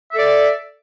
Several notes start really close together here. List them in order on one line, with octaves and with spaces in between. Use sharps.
E5 A4 D5